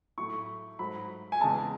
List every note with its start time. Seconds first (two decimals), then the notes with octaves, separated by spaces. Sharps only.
0.18 A2 F#3 A3 C#6
0.79 G#2 F#3 A3 B5
1.32 G#5
1.41 E2 C#3 G#3 A5